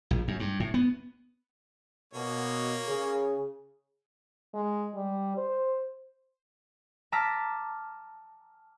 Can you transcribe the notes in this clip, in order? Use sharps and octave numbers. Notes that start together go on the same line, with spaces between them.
A#1
F#2
G2
A2
B3
B2 A#3 C#5
C#3 G#4
G#3
G3
C5
A5 A#5 D6 E6 F6 B6